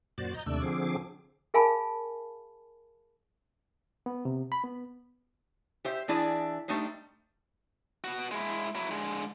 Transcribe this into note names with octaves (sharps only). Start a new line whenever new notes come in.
F#2 A#2 F#4 C5 D5 A6
D#5 A#5 G6
D#2 C3 A3 D4 D5 E6
D3 F3 C4 G#4 D6
G#4 A#4 F5 G#5 A5 B5
B3
C3
B5
B3
G4 C5 E5
E3 D4 E4 G#4 D5
G3 A3 D4 D#4 C5
B3 F#4
G#3 E4
F#3 E4
D3 G#3